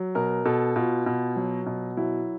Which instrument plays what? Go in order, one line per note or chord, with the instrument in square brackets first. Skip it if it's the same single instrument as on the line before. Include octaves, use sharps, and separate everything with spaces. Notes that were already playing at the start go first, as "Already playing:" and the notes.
Already playing: [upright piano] F#3
B2 A#4
B2 A4
B2 F4
B2
F#3
B2
F#3 E4